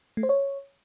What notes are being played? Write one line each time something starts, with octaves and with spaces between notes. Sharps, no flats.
A3
C5
C#5